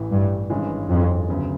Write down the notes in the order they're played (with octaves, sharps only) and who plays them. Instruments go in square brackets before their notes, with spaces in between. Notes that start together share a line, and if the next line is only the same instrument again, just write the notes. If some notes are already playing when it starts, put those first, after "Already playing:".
Already playing: [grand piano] A1 A2 E3
[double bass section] G2
[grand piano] G#1 G2 E3 G#3 C#4
[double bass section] F2
[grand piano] D2 C#3 F#3 B3